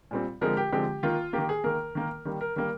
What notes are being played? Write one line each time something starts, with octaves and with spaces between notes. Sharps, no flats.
A#2 G3 C4
D3 F3 G#3 C4 A#4
G4
D3 F3 G#3 C4 G4
D#3 A#3 F4
D#3 A#3 G4
G#4
D#3 A#3 A#4
D#3 A#3
D#3 G3 A#3
A#4
D#3 G3 A#3 A#4